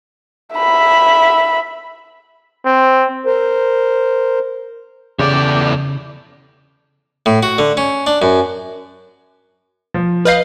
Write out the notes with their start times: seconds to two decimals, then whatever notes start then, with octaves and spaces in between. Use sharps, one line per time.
0.56 E5 B5
2.65 C4
3.26 A#4 C5
5.19 E2 C#3 G4 A4 C#5 D5
7.26 A2
7.43 F#4
7.58 D3
7.77 C#4
8.07 D4
8.22 F#2
9.94 F3
10.25 B4 D#5 F5 F6 G6 C7